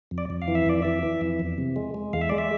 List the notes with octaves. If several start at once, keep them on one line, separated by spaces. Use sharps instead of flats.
F2
D5
F2
F5
E3
E5
F2 D5
E3 E5
E3
F2
E2
C3
G#3
G#3
E2 F5
E5
G#3 D5
E5